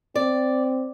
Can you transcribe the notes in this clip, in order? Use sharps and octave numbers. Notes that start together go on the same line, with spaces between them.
C4 D5